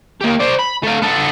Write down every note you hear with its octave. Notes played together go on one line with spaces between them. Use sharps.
A#3 G4
C5 D5
B5
A3 F5
B3 A4